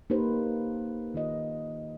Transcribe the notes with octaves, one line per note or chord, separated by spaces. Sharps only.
A#3 D#4 G4 B4 C5
D#3 F4 D#5